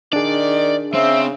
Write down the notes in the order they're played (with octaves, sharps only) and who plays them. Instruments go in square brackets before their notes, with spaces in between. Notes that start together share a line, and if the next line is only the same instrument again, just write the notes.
[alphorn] D#3 [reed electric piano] D4 G#4 [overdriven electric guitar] D5
[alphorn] C#3 [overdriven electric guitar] C4 [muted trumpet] E5